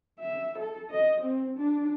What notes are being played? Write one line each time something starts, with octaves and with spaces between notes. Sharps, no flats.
E5
A4
D#5
C4
D4